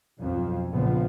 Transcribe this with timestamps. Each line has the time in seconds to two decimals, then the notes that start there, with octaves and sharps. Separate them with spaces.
0.18 B1 F2 F3
0.70 A#1 C#3 F3 B3